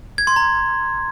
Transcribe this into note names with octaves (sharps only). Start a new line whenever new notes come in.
G#6
C6
A#5